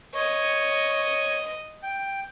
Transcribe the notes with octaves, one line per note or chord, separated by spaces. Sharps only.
C#5 D#5 C#6 D#7
G5